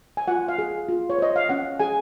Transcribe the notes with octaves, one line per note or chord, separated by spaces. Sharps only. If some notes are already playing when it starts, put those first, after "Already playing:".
G#5
F4 F#5
F5
G#4
F4
C#5
C5 D#5
F5
C#4 F#5
G#4 G#5